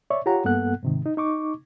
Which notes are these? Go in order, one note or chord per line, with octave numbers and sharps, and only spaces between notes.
C#5 D5 E5 C#6
F4 G4 C#5 F#5 A#5
G2 A#3 B3 A4 F#5 F#6
G#2 C3 D#3
D#4
D#4 C#6 D6